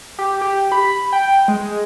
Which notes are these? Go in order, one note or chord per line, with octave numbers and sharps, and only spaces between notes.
G4
G4
B5
G5
G#3